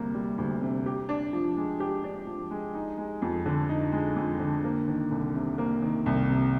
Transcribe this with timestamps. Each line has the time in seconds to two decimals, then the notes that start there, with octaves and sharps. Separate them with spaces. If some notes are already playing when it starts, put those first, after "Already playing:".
Already playing: D2 C3 G3 A#3
0.14 G3
0.38 D2
0.61 C3
0.86 G4
1.09 D4
1.33 F3
1.57 G#3
1.80 G4
2.04 D4
2.27 F3
2.51 G#3
2.74 D#4
2.98 G#3
3.22 F2
3.46 D3
3.69 D#4
3.92 G#3
4.16 F2
4.39 D3
4.64 A#3
4.88 D#3
5.11 C2
5.35 C3
5.58 A#3
5.82 D#3
6.06 C2
6.29 C3